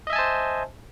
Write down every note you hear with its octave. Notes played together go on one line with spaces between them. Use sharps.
C5 D#5 E5 G#5 A5